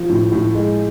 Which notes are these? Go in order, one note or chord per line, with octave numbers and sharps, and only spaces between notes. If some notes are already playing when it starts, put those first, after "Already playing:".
Already playing: F3
A2
A2
G#3